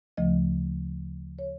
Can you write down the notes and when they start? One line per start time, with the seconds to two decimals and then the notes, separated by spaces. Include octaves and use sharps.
0.17 D2 C#3 F3 A3 D#5
1.39 C#5